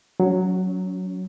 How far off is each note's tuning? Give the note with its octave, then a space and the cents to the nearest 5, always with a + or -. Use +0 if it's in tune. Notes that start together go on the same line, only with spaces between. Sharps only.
F#3 +0 C#4 +40